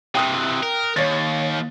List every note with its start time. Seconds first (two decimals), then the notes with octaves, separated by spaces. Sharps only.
0.15 C3 E3 G5 D#6 F#6
0.63 A#4
0.96 D#2 C#5 A6